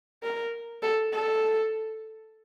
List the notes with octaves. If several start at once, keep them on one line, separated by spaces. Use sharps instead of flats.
A#4
A4
A4